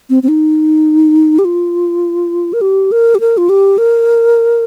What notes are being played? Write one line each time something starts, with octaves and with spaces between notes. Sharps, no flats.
C4
C4
D#4
G4
F4
A#4
G4
A#4
G4
A#4
F4
G4
A#4